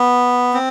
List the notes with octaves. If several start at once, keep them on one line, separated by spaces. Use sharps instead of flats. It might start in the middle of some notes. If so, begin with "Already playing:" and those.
Already playing: B3
C4